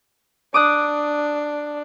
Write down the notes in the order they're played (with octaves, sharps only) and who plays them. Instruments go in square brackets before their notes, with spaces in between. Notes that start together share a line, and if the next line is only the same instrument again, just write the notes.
[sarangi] D4 [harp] D6 D#6 F#6